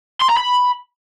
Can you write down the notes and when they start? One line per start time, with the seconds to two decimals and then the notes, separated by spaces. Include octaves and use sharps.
0.21 C6
0.29 A#5
0.37 B5